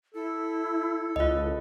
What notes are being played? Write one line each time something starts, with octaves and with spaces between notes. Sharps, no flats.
E4 A4
C#2 F4 D#5